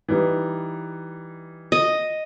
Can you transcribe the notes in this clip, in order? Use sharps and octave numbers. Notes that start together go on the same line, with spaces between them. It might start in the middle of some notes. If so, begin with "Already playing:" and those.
E3 G3 D#4
D#5